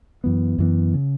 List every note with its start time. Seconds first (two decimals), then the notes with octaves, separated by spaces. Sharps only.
0.24 F#2 E3 B3
0.58 F#2 E3 B3
0.94 C#3